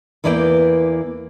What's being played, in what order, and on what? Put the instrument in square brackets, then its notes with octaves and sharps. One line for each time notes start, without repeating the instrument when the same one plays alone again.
[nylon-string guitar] E2 E3 A#3 D5 D#5 G5